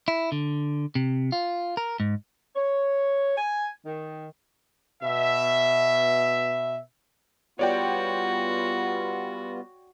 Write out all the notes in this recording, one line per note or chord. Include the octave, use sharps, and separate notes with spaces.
E4
D3
C3
F4
A#4
G#2
C#5
G#5
D#3
B2 E5
G3 B3 F4 F#4 C#5 D5 G5